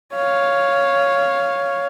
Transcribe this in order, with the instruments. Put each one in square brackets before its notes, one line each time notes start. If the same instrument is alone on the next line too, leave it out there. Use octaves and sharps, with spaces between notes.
[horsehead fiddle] C#5 F5